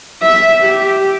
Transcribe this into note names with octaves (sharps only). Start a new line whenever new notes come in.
E5
G4